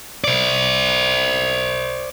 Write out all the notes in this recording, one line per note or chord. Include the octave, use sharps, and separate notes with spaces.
C5 D5